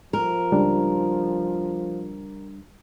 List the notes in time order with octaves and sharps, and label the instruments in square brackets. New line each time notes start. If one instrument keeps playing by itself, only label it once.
[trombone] F3 [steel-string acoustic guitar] A#4
[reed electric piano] C#2 G3 D4